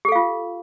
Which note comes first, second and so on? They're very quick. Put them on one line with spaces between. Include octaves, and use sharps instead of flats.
G4 A4 F5 F4